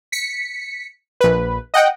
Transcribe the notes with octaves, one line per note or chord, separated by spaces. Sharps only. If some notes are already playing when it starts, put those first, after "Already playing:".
B6 C#7
A#1 B4
D#5 F#5 G5